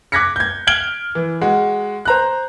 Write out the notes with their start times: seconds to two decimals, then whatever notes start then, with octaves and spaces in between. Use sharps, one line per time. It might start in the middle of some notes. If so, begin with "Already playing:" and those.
0.12 D6 F#6 G#6 A#6 B6 C#7
0.36 G6 G#6
0.67 F6 G#6 D7 G7
1.15 E3
1.41 G#3 F#4
2.05 C5 A#5 F#6